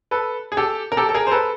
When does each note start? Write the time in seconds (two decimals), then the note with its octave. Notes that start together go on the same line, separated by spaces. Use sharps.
0.11 A4 B4
0.52 G#4
0.57 G4 A4
0.92 A#4
0.97 G4 A4
1.09 A4
1.14 G#4 A#4
1.27 C5
1.31 A4 B4